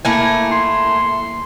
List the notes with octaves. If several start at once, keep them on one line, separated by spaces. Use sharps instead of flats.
A3 A#3 E4 G#5
C6